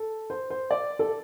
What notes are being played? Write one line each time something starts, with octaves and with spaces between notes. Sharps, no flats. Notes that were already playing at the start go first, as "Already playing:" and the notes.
Already playing: A4
C5
C5
D5
A4